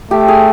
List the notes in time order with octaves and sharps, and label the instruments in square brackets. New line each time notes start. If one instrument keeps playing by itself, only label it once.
[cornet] A3 [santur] G4
[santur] G#4